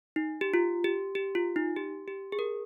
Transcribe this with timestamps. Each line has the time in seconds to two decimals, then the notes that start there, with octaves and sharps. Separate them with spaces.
0.16 D#4
0.41 G4
0.54 F4
0.84 G4
1.15 G4
1.35 F4
1.56 D#4
1.76 G4
2.08 G4
2.32 G#4
2.39 A#4